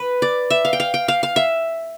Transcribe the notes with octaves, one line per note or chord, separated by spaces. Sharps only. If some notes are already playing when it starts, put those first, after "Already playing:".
Already playing: B4
D5
E5
F5
G5
F5
G5
F5
F5
E5